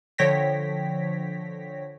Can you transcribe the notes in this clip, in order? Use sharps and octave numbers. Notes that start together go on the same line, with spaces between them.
D3 F3 C#5 G5 A#6 B6